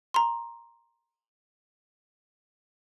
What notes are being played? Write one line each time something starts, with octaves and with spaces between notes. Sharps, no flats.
A#5 C6